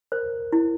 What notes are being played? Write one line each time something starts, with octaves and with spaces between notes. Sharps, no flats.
A#4 C5
E4